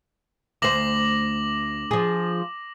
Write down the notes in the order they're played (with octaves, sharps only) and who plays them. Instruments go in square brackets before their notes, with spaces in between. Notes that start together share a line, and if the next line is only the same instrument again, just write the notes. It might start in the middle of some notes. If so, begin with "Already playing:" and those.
[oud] D2 C5 [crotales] D6 A#6 F#7
[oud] F3 G#4